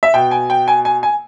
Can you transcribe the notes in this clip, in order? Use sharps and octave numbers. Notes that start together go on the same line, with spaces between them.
E5
B2 G5
G#5
G5
G#5
G#5
G#5